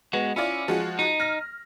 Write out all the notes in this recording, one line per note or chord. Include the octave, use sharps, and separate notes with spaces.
G#3 B3 F#4
C#4 E4 F4 D5
F3 G#3 F#4
D#4
F6 A#6